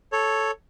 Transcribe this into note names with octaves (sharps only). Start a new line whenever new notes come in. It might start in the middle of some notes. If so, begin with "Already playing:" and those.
A4 C#5